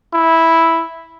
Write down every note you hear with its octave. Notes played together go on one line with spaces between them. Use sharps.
E4